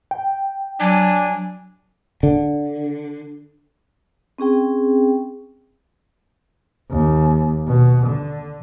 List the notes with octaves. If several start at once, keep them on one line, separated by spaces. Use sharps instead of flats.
G5
F#3 D4 G#5
D3
C4 C#4 G#4 G5
D#2
B2
D3